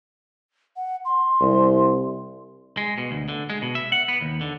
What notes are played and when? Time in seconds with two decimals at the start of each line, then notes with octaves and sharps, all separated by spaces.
0.76 F#5
1.05 C6
1.41 C2
2.77 G#3
2.98 B2
3.11 D2
3.28 D3
3.50 G#3
3.62 B2
3.75 E5
3.92 F#5
4.08 B3
4.21 D#2
4.41 D3